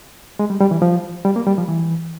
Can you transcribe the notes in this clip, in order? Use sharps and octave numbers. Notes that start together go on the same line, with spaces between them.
G#3
G3
G3
E3
F3
G3
A#3
G3
F3
E3